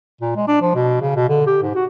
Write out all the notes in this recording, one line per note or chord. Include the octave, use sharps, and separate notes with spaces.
A#2
G#3
D4
F3
B2
C#3
B2
D3
G4
G#2
F#4